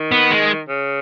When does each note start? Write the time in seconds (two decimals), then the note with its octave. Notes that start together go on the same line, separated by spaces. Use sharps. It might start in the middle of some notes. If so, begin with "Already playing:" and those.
Already playing: D#3
0.12 B3
0.31 G#3
0.69 C#3